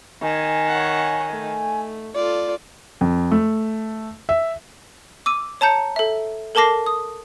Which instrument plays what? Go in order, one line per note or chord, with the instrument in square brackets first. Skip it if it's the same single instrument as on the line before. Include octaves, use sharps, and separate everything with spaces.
[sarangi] D#3 [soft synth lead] G#5
[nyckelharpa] C#5 F#5
A3
[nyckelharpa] F4 A4 [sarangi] D5
[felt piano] F2
A3
E5
[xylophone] D6 E6 D#7
C#5 A5 A#5 G6 C#7
A4 E5
A4 A#4 A5 D6 A#6 C7
D#6